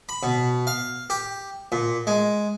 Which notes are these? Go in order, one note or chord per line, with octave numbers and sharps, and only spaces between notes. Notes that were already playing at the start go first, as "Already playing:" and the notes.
B5
B2
F5
G4
A#2
G#3